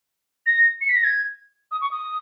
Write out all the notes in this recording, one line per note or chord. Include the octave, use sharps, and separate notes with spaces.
A#6
C#7
B6
A#6
G#6
D#6
C#6
D#6